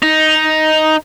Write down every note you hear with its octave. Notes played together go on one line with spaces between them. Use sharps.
D#4